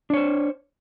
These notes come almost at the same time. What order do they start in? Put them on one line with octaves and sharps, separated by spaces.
D4 C#5 C5